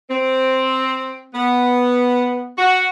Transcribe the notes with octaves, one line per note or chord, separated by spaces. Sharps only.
C4
B3
F#4